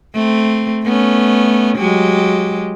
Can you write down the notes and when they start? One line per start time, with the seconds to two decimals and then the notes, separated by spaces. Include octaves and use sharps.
0.14 A3 C4
0.84 A3 B3 C#4
1.77 F#3 G#3 G4